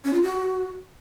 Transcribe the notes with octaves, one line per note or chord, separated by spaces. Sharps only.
C#4
F4
F#4